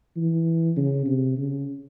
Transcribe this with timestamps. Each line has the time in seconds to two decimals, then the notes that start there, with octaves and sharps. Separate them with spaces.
0.17 E3
0.77 C#3
1.06 C3
1.38 C#3